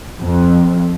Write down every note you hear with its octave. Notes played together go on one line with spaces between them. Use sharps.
F2